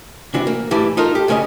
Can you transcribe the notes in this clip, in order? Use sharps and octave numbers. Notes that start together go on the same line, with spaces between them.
C3 E3 D4 F#4
A#3
A2 E3 G3 E4
D#4 F4 A4 A#4
G4
G2 C#3 C#4 B4 D#5